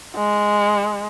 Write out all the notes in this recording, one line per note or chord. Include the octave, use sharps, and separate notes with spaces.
G#3